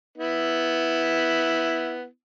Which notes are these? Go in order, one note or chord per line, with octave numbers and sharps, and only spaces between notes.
B3 E4